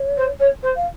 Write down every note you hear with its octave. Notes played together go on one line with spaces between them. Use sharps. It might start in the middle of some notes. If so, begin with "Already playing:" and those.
Already playing: C#5
C5
C#5
C5
F5